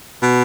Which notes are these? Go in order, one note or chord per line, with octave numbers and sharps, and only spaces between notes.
B2